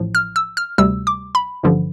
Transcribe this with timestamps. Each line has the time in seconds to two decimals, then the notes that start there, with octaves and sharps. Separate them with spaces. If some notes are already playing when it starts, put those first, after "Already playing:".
Already playing: A1 A2 F3
0.15 F6
0.36 E6
0.57 F6
0.78 D2 C3 G3 E6
1.07 D6
1.35 B5
1.63 A1 G2 D3 F3